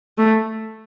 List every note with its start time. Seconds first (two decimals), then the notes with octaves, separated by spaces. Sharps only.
0.18 A3